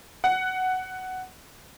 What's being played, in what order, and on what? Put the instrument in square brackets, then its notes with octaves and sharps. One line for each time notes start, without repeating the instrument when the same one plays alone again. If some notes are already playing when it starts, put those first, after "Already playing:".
[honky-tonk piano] F#5